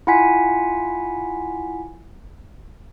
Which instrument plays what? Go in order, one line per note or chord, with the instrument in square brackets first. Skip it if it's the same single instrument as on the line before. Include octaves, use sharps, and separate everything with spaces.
[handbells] E4 F4 F#5 G#5 B6